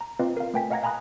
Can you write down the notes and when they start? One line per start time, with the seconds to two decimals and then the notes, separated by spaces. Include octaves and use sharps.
0.01 A#5
0.19 C4 F4 B4 D#5 F5
0.37 A#4 F5
0.54 A3 B4 G5 G#5 B6
0.70 D#5 F5 F#5 A#5 G#6 A#6
0.83 F5 G#5 A#5 B5 D#6 F#6